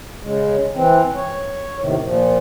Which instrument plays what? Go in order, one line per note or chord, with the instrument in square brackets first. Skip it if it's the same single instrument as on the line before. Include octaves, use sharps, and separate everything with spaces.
[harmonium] C#3 G#3
E3 C4
C#5
D#2 A2 C3 D#3
A#2 F3